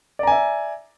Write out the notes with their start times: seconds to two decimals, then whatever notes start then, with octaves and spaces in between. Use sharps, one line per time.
0.19 D5
0.23 A#5
0.27 G#5
0.31 E5